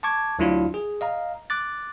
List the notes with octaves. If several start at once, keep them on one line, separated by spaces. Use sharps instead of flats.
A5 C#6 D6 G#6
D2 F#3 D4 E4 F4 F5
G#4
D#5 F5 A#5
D6 F#6 A6